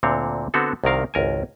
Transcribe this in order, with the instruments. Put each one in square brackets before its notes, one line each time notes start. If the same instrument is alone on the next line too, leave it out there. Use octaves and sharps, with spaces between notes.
[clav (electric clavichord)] D2 A#2 D3 C4 C#5
D3 B3 C4 F#4 A4
C2 C3 D#3 A#4 F5
G#1 C#2 A#4 G#5